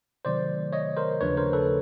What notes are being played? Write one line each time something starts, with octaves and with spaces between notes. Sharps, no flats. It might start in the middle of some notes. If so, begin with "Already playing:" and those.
C3 D#3 F#3 A3 C5 D5
C#5 D#5
A#4 C5
D#2 C#3 F3 A3 D4 B4 C#5
A#4 C5
A4 B4